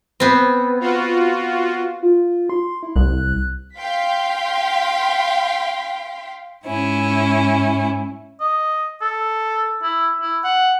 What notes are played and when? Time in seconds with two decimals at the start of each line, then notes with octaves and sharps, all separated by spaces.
0.20 B3 C4
0.80 F4 F#4
2.03 F4
2.50 C6
2.83 E4
2.96 C2 F#6
3.77 F5 G5 C6 B6
6.65 G#2 C#4 E4
8.40 D#5
9.01 A4
9.83 E4
10.21 E4
10.44 F#5